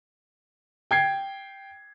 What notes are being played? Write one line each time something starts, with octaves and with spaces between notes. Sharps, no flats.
G5 G#6 C7